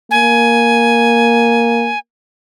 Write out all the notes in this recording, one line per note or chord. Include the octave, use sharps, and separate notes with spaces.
A#3 G#5